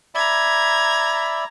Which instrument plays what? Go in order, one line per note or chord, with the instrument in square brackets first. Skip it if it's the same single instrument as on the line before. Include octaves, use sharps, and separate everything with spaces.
[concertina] D5 E5 B5 [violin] A#5 G#6